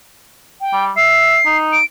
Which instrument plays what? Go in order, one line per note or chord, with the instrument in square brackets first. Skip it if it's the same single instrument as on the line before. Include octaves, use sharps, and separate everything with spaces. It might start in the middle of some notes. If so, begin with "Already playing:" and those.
[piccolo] G5
[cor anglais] G3
[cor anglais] E5 [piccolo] C7
[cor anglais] D#4
[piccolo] D7